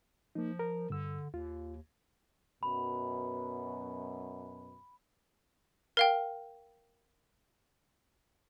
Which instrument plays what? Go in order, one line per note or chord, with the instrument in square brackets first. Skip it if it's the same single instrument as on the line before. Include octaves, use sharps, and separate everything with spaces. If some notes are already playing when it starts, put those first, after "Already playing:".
[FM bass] F3 [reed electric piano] A#3 D#4
[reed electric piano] A#4
[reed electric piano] G2 E6 [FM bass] D3
[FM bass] D#2 [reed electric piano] F4
[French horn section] F#2 B2 [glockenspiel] B5
[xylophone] A#4 F5 G5